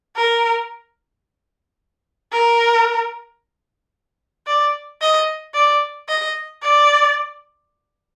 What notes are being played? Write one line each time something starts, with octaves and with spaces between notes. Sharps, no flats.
A#4
A#4
D5
D#5
D5
D#5
D5